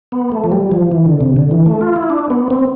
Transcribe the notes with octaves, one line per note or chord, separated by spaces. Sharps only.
B3
A3
F3
G3
F3
E3
D3
C3
D3
E3
A3
F4
E4
D4
B3
C4